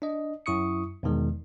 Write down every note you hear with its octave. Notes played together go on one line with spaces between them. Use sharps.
D4 D#5
F#2 E4 C#6 D#6 C#7
E2 B2 D#3 G#3